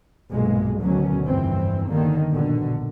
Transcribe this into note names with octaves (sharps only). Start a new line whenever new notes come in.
B1 G2 A#2 G#3 A#3
D2 B2 D3 D#3 F#3 C#4
F1 G2 E3 C4
G1 D#2 D3 D#3 A#3
A#1 B2 D3